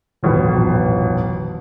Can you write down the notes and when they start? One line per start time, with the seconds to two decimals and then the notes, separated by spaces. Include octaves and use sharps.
0.23 D#1 A1 F2 B2